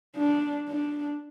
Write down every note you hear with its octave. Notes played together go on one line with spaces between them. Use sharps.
D4
D4